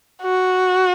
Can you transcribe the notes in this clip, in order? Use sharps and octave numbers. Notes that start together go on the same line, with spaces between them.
F#4